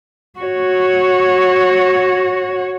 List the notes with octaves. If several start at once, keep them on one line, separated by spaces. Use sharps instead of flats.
F#4 C#5